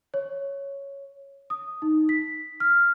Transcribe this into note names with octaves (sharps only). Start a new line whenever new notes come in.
C#5
D#6
D#4
B6
F6